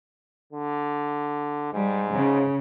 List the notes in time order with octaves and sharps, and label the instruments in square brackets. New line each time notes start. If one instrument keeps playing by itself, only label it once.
[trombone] D3
[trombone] G#2 [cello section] G3
[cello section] C#3